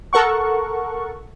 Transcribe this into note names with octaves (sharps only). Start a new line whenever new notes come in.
A4 A#4 F#5 C#6